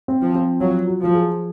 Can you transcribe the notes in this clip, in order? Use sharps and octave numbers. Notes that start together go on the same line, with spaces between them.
C4
F3
C4
F#3 F4
F#3
F3
G#4